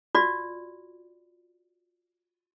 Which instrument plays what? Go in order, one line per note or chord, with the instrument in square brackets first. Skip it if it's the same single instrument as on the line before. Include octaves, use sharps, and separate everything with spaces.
[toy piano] F4 F#4 D5